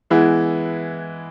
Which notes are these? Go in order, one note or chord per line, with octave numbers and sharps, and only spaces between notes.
E3 G#3 B3 E4